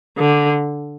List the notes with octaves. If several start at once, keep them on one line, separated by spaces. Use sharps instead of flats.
D3